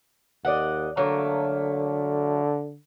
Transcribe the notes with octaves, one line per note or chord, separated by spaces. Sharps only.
D#2 D5 D#5 F#5
D3 F#3 A3 A#3